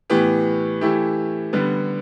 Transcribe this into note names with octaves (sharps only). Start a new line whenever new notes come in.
A2 E3 B3 G4
E3 A3 E4 G4
D3 G3 B3